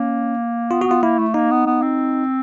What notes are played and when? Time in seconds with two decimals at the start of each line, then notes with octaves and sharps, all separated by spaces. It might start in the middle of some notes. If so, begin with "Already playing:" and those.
Already playing: A#3 C#4
0.71 B3 F4
0.81 F#4
0.87 B3 F4
1.03 A#3 E4
1.19 A3
1.34 A#3 D#4
1.51 B3
1.66 B3
1.82 C4